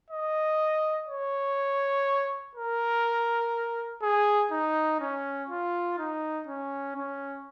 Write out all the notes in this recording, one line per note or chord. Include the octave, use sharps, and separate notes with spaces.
D#5
C#5
A#4
G#4
D#4
C#4
F4
D#4
C#4
C#4